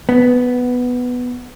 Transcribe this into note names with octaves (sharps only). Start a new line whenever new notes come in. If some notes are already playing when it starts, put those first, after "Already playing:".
B3